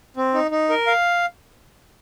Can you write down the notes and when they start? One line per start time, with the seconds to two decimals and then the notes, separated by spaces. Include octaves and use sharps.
0.17 C4
0.34 D#4
0.51 D#4
0.69 A#4
0.87 F5